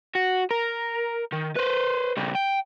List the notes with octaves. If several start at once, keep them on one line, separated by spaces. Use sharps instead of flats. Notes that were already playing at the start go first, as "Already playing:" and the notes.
F#4
A#4
D#3
B4 C5
C#3 G3
G5